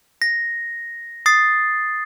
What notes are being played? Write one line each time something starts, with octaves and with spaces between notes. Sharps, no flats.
A#6
D#6 A6 C7